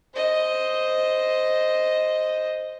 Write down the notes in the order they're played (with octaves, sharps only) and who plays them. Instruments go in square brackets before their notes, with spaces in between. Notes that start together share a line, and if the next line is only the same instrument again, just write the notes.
[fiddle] C5 D#5